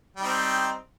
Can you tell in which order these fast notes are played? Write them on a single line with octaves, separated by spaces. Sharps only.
G3 D#4 C4